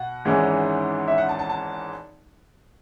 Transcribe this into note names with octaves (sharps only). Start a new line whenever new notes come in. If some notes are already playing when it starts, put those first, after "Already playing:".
Already playing: B2 F#5
G#1 G#2 E3 G#3 C#4
E5
F#5
A5
A5
A5